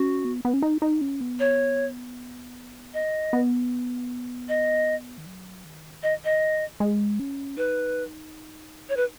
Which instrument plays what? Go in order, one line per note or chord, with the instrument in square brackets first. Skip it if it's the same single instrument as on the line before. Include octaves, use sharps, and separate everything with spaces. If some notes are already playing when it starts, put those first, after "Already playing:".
Already playing: [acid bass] C#4 [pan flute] F#4
[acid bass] B3
B3
C#4
D#4
D#4
C#4
B3
[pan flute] C#5
D#5
[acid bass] B3
[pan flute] D#5
[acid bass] D#3
F#3
D#3
[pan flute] D#5
D#5
[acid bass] G#3
C#4
[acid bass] D#4 [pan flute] B4
[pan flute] C#5
B4